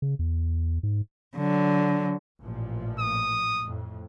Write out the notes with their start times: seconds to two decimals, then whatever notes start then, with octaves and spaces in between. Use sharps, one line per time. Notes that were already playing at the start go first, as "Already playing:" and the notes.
0.02 C#3
0.19 E2
0.83 G#2
1.36 D3 F#3
2.41 A1 A#2 F3
3.00 D#6
3.64 F2 A2